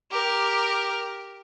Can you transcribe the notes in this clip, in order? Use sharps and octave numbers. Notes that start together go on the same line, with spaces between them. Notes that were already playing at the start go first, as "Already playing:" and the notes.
G4 A#4